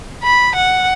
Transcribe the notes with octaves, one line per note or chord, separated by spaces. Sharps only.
B5
F#5